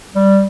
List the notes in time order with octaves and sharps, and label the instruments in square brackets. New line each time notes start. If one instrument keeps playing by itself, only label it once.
[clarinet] G3